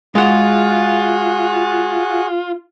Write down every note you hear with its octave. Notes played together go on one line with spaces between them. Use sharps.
G#3 F4 F#4 G#4 F#5 F#6